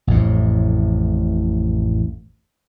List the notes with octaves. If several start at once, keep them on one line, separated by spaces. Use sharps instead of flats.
A1 F2 A2